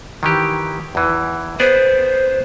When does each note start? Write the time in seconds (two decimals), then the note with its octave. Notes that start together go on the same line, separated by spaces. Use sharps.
0.23 D#3 E3 G4
0.95 E2 E3
1.60 B3 G#4 C5 D5